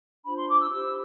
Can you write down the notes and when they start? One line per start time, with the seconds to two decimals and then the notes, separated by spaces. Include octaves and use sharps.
0.24 D4 F4 C5 B5
0.37 C6
0.49 D6
0.60 E6
0.70 E4 G4 C5 E6